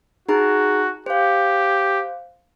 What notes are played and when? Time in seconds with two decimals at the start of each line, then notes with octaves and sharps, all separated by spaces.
0.29 D#4 F#4 G#4 A#5
1.06 G4 C5 F5